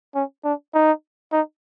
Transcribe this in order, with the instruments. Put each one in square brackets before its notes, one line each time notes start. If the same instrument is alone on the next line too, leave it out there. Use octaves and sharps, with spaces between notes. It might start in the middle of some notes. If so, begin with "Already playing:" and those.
[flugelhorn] C#4
D4
D#4
D#4